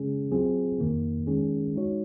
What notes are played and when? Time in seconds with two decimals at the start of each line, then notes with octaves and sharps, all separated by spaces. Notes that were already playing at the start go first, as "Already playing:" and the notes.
Already playing: C#3 G#3 C#4 G#4
0.32 F#3 C4 F4 G#4
0.80 F2 D#3 A#3
1.27 D#3 G#3 C#4 G#4
1.75 G#3 D#4 F#4 C#5